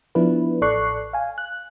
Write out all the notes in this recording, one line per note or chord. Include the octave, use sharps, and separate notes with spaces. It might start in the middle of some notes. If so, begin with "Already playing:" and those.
F3 B3 D4 E4 B4
A1 A4 D5 C#6 F#6 C7
F5 G#5
F#6